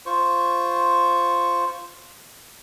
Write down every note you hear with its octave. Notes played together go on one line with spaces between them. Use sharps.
F4 C5 C#6